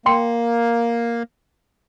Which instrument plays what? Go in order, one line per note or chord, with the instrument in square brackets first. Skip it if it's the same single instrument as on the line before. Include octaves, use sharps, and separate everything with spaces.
[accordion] A#3 [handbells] G5 C6 C#7